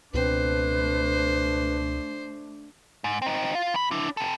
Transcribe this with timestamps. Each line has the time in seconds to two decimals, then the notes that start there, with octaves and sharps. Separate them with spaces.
0.14 C#2 B2 A3 C4 D4 B4 C5
3.04 G#2
3.22 C4 D#4
3.55 F4
3.74 E3 B5
3.91 D4 E4
4.17 C3 A4